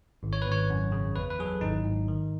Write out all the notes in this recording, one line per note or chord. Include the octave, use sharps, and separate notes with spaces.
G#1
C#5
B4
G#1 C#5
F#2
C#3
E2 B4
B4
F#3 G#4
A4
G#1 D#4
G#2
D#3